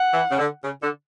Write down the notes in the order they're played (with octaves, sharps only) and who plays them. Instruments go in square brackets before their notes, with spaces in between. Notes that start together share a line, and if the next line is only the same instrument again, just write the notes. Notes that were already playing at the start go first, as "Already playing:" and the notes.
Already playing: [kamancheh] F#5
[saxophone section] E3
C#3
D3
C#3
D3